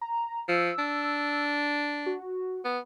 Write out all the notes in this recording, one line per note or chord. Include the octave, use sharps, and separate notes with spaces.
A#5
F3 E6
D4
F#4
B3